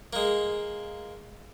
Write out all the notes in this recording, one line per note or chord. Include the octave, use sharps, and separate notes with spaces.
G#3 A#3